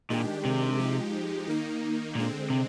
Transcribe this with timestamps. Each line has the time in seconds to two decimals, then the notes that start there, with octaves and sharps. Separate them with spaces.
0.10 A#2 D#3 G#3 D4 G4
0.45 C3
0.78 F3 G#3 D#4 G4
1.47 D#3 A#3 D#4
2.15 A#2 D3 G#3 C4
2.50 C3